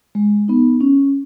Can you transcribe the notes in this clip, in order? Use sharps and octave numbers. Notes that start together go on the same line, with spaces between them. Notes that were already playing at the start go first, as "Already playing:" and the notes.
G#3
B3 D#4
C#4